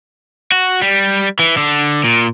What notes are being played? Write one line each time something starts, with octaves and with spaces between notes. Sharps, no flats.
F#4
G3
E3
D3
A#2